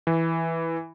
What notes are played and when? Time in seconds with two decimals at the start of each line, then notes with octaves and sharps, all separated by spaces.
0.07 E3